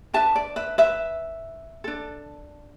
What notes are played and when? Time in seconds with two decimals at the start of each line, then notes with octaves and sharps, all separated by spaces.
0.14 D4 B4 E5 A5
0.36 D5
0.56 B4 E5
0.78 B4 E5
1.84 D4 A4